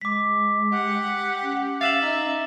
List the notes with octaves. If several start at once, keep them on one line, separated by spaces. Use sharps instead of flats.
G#3 D6 B6
G4 F#5
C#4
E5 F5 A6 E7 F#7
D#4